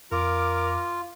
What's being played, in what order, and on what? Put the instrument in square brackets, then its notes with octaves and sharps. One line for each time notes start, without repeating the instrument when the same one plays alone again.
[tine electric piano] F2 [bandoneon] F4 [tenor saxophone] A#4 [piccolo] D6